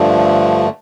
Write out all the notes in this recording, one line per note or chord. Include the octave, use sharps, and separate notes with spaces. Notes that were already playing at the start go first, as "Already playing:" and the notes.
Already playing: G2 D3 F3 A3